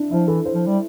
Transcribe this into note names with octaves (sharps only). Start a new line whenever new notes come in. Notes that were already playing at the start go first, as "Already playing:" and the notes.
Already playing: D4 E4
F3 E4
E3 A4
C5
F3
G3